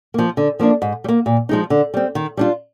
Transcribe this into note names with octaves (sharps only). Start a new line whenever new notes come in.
F3 A#3
D3
F3 A#3 D4
G#2
G3
A#3
A#2
F3 G#3 D#4
D3
G3 C4
D#3
G3 D4 F4